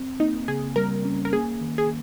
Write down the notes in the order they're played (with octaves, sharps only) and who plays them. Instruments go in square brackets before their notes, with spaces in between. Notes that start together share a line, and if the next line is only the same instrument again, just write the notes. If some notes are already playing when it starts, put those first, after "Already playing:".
Already playing: [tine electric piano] C4
[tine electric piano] A#3 [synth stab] D#4
[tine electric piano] C#3 [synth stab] G#4
[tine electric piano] G3 [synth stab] A#4
[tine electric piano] C#4
[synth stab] A#4
[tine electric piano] A#3 [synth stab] G#4
[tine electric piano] D#3
[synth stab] G#4